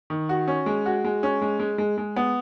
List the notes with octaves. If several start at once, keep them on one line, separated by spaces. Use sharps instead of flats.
D#3
F#4
C#4
G#3
F#4
G#3
C#4
G#3
G#3
G#3
G#3
B3